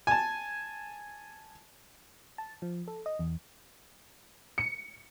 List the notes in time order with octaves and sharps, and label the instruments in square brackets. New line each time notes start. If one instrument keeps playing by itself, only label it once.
[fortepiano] G#5 A5
[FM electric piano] A5
F3
A4
D#5
E2
[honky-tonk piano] C#7